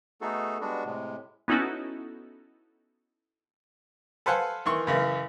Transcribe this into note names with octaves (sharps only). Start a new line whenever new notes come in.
A3 B3 D#4 F#4 G#4 A4
G3 G#3 B3 D4 F#4
A2 C3 G#3
B3 C#4 D#4 E4 F#4 A4
A4 B4 C5 F5 F#5 G#5
D#3 E3 C6 C#6
F#2 C#3 E3